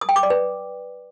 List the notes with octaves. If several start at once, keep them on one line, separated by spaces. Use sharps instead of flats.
D#6
G5
D6
D5
B4